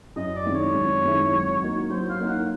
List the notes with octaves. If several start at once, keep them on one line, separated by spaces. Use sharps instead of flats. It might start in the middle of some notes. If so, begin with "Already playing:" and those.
F#2 D#5
D5
D#3 G#3 C4 E4
C#5
F#2
D#3 G#3 C4 E4
F#3
A#3 D#4 F#4
F#3 C5
F5
A#3 D#4 F#4
F#5